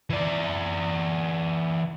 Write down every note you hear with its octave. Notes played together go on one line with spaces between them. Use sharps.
E3 D5